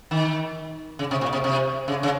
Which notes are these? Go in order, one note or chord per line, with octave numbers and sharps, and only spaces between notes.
D#3
C#3
C3
A#2
C3
C3
C#3
C#3